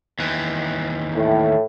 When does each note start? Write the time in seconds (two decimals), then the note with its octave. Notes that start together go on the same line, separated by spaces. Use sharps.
0.19 D#2 E3
1.15 A2